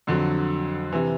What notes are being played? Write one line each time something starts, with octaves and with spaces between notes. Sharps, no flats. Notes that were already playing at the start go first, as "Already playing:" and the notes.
F2 D3 F#3
C3 E3